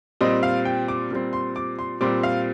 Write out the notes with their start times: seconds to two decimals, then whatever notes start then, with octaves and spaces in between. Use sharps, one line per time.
0.21 A#2 G3 C4 D#5
0.43 F5
0.65 G5
0.88 D6
1.11 A#2 G3 C4
1.33 C6
1.56 D6
1.79 C6
2.01 A#2 G3 C4 D6
2.23 F5